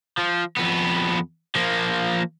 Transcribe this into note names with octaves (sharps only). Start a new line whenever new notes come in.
F3
F2 B3
F3 A#3